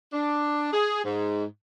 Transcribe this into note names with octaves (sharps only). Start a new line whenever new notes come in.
D4
G#4
G#2